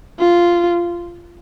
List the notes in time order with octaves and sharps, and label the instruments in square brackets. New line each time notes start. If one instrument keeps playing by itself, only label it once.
[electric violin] F4